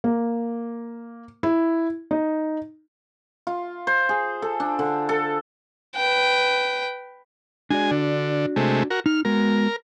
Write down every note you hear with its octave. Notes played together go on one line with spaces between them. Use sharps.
A#3
E4
D#4
F4
C5
G#4
A4
D4
D3
A4
B4 G5
G#3 D4 F#4 D5 G#5
D3
C3 G#3 A3
F#4 A#4
D#4 F6
G#3 B3 F#4 A#4